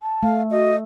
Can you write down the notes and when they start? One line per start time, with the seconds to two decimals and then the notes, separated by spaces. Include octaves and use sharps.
0.02 A5
0.23 A3 F5
0.51 F#4 D#5